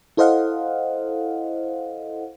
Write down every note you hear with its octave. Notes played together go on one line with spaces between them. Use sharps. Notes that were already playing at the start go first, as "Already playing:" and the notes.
E4 A4 C5 D#5 F5 F#5